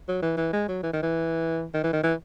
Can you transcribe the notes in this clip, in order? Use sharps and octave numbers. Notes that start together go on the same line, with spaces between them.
F#3
E3
E3
G#3
F#3
E3
D#3
E3
D#3
E3
D#3
E3